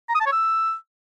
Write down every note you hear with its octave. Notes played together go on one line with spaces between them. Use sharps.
A#5
D#6
A5
C#5
E6